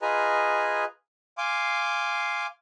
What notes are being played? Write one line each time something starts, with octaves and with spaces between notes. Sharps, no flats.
F4 G#4 B4 D#5 G#5 A#5
F5 G#5 C6 D6